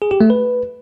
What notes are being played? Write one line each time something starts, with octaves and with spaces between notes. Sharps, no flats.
G#4
G4
A3
B4